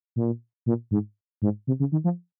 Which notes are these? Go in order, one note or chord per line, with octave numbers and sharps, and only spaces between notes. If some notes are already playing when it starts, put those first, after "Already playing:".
A#2
A#2
G#2
G#2
C3
C#3
D#3
F3